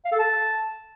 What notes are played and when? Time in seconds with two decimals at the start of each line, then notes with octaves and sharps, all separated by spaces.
0.05 F5
0.12 A4
0.19 A5